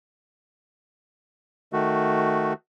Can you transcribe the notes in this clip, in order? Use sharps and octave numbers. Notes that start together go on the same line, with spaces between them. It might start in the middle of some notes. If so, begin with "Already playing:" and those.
D#3 A3 F#4